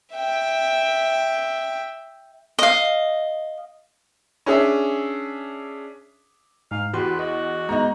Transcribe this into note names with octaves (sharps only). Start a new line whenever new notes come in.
E5 G5
D#5 F5
C#4 D4 G#4 E5
G#2 F5
E2 F#4 G4 B4 C6
F#4 D#5
G#3 B3 D#4 A#5